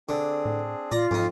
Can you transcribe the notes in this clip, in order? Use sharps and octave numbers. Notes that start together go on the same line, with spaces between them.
D3 C4 D4 G#4
A2
A#2 F4 D5 A#5
F2 G#2 D#4